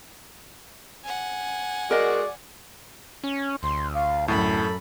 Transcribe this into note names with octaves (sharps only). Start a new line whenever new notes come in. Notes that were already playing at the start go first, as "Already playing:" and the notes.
F#5 G#5
G#3 F#4 A#4 D5 D#5
C#4
D2 C6
F5
F#2 A2 A4 B5